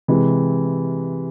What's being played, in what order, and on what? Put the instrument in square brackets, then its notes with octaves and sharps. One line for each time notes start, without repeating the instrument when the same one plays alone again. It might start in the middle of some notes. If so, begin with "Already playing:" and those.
[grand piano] C3 E3 G#3